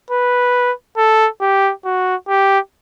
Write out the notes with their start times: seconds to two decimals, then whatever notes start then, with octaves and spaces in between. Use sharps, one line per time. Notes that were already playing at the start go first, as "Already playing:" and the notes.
0.10 B4
0.97 A4
1.41 G4
1.85 F#4
2.28 G4